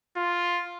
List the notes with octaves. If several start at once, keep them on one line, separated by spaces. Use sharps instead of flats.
F4